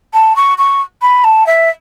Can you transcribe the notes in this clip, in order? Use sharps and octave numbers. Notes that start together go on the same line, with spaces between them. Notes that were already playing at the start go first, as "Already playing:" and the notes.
A5
C#6
C#6
B5
A5
E5